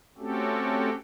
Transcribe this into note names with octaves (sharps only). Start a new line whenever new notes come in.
A3 C4 C#4 F#4 G4 A4